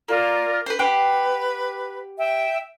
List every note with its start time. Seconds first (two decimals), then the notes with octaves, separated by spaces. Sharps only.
0.08 A#3 F4 A#4 D5
0.66 B4 C5
0.79 G4 B4 F#5 C6
2.18 E5 G5